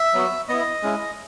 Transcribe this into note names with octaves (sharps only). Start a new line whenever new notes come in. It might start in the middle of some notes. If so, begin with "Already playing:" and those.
Already playing: E5
F#3 B3 F#4
B3 E4 D#5
G#3 C#4 E4